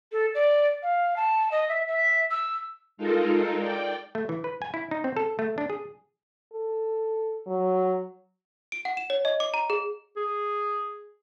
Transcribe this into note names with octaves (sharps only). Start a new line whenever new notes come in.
A4
D5
F5
A5
D#5
E5
E5
E6
G#3 D#4 F4 A4 A#4
D5 G5
A3
E3
B4
G#5
E4
D#4
C4
A4
A3
D4
G#4
A4
F#3
D7
F#5
E7
C#5
D#5
D6
A#5
G#4
G#4